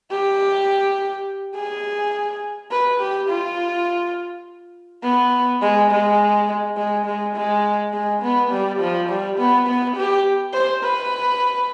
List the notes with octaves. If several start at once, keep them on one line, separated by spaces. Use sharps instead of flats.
G4
G#4
B4
G4
F4
B3
G#3
G#3
G#3
G#3
G#3
G#3
B3
G3
F3
G3
B3
B3
G4
C5
B4